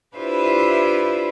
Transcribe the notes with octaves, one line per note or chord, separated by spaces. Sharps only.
D4 E4 F4 G4 B4 C5